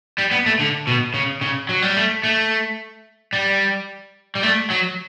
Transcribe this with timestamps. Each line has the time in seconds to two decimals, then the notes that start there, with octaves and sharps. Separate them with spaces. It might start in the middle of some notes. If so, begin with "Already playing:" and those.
0.18 G3
0.31 B3
0.46 A3
0.59 D3
0.87 B2
1.14 C#3
1.41 C#3
1.69 F#3
1.82 G3
1.96 A3
2.24 A3
3.33 G3
4.35 G3
4.43 A3
4.70 F#3